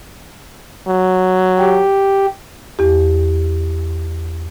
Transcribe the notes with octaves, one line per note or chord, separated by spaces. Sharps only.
F#3
G4
E2 G4